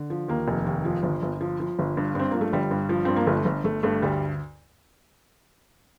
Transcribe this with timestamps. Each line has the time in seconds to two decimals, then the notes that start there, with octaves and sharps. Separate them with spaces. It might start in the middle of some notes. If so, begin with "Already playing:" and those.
Already playing: D3
0.10 F3
0.28 D#2 A#3
0.48 F1
0.66 D#2
0.85 F3
1.03 G1
1.22 G1
1.41 F3
1.60 F3
1.79 G1
1.97 G2
2.15 G2 C4
2.31 F3 A#3
2.41 A3
2.53 G1 G3
2.71 G2
2.89 F3
3.05 G2 C4
3.16 A#3
3.27 G1 A3
3.45 G1
3.64 G1 A3
3.83 G2 A3
4.02 D2 G3